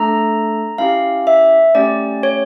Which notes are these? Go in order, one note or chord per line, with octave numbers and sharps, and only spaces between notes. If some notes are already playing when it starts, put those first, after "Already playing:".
Already playing: A3 D4 A4 A#5
C#4 E4 G4 F5
E5
A3 C#4 G4 D5
C#5